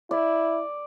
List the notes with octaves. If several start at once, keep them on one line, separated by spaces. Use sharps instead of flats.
E4 D5